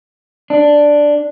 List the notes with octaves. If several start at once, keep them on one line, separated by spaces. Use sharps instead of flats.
D4